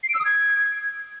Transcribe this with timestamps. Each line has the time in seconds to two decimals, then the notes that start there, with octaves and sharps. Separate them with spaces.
0.03 C7
0.09 D7
0.14 E6
0.20 D#6
0.25 G#6